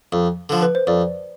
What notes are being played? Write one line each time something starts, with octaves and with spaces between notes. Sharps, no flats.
F2
D3 F3
B4
C5
F2 D5